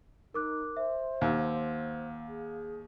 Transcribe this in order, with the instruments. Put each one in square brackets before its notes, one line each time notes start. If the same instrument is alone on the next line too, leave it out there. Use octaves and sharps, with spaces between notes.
[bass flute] D#4 [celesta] A#4 D6 F#6
[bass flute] C5 [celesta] E5
[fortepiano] D#2 [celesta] F5 F#5 E6
[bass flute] G#4